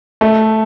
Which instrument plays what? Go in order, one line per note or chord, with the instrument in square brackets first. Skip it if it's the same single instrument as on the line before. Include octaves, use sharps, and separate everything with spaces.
[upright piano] A3